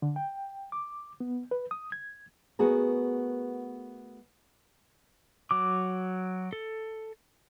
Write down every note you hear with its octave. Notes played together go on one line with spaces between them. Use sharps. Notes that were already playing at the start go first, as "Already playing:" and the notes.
D3
G5
D6
B3
B4
D#6
G#6
A3 B3 F#4 G#4 A#4
F#3 D6
A4